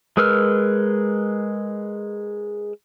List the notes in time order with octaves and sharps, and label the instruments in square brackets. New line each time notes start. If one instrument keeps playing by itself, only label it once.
[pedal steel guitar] G#3 A#4 B4 E6 F6